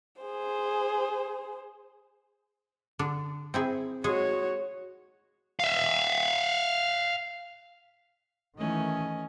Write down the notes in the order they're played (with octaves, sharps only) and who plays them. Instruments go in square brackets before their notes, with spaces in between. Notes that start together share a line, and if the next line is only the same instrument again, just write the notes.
[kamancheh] G#4 C5
[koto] D3 D4
C4 E4 G#4
[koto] G#3 G#4 [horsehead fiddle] F#4 C#5
[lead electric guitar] E5 F5
[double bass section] D#3 E3 A3 [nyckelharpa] C#4 D#5